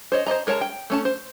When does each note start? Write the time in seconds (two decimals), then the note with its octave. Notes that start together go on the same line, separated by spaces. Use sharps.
0.12 C5 C#5 D#5
0.27 C5 D5 D#5 A#5
0.47 G#3 A#4 C#5 A5 A#5
0.61 G5
0.90 A3 C#4 A5
1.05 C5